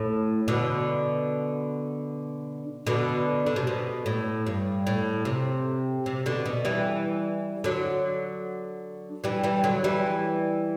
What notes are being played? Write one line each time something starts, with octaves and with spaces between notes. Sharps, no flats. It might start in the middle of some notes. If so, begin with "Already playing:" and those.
Already playing: A2
B2 D3
B2 D3
D3
C3
B2
A2
G2
A2
C3
C3
B2 D3
B2
E3 G3
D3 F#3
E3 G3
E3 G3
D3 F#3
E3 G3